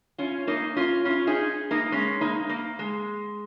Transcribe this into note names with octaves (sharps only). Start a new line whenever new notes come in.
C#4 F4
A#3 D#4
C#4 F4
C#4 F4
D#4 G#4
A#3 D#4
G#3 C#4
A#3 D#4
A#3
G#3